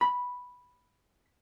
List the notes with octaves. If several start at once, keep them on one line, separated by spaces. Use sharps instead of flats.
B5